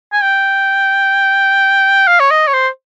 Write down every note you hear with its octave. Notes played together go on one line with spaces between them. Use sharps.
G#5
G5
F5
C#5
D#5
C#5
C5